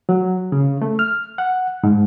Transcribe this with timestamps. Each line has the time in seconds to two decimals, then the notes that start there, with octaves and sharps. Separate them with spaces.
0.09 F#3
0.52 C#3
0.82 A3
0.99 F6
1.38 F#5
1.84 G#2